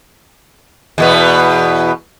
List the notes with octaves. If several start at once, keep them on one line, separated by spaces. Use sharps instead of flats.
E2 B2 B3